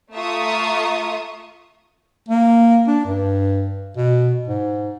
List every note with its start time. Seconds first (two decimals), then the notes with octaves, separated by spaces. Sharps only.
0.14 A3 F4 E5 A#5 C#6 D#6
2.29 A#3
2.87 D4
3.05 G2
3.97 B2
4.47 G#2